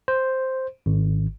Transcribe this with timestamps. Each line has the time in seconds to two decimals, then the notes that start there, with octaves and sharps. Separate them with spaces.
0.08 C5
0.86 G#1